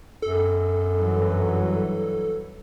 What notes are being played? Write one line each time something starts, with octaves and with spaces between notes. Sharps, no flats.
F#2 A4
G2 E3 F#3